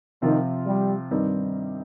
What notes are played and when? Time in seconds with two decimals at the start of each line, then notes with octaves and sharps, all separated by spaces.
0.22 C3 D#3 F3 C4 F4
0.67 G3
1.11 G2 D#3 G3 C4 D#4